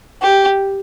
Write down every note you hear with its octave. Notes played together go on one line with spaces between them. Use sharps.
G4